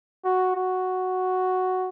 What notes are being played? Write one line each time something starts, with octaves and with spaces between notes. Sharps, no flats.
F#4
F#4